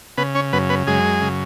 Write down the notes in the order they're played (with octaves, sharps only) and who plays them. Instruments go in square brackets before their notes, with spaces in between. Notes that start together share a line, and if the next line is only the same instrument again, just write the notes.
[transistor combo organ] C#3 B3 B4
C#4 C#5
F#2 B3 B4
B3 B4
F#2 G#3 G#4
C#3